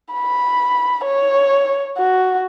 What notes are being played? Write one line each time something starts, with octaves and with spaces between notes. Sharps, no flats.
B5
C#5
F#4